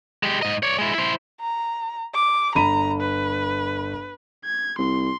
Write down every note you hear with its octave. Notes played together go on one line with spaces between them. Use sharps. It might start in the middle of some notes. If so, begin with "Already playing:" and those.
G#3 G4
G#2 D#5
C#5 D5
G#3 E4
E4 C5
A#5
D6
G1 A#5 B5 D#7
B4
G#6
C2 C6